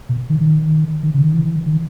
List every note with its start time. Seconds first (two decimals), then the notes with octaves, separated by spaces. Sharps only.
0.09 B2
0.30 D#3
0.40 D#3
1.03 D#3
1.14 C#3
1.24 D#3
1.34 E3
1.66 D#3